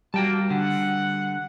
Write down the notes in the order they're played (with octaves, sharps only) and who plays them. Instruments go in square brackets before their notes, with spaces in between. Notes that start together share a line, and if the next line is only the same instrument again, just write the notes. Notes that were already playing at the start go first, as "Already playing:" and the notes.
[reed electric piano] G3 [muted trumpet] A#3 [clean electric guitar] F#4 G5 A5
[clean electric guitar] D3 [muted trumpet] F#5